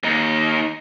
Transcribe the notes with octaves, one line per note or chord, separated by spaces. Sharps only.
D#2 D#4